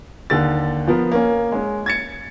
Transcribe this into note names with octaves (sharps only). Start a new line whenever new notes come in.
D#2 D3 A6
F3 B3 A#4
A#3 C#4
G#3 C#4
G#6 A6 C#7